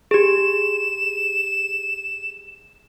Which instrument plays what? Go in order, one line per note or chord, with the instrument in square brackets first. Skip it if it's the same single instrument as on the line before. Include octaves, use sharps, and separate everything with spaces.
[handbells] G4 G#4 [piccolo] E7